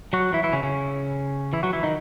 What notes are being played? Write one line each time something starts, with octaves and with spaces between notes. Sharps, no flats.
F#3 F#4
E3 E4
E3 E4
C#3 C#4
C#3 C#4
E3 E4
F#3 F#4
E3 E4
D#3 D#4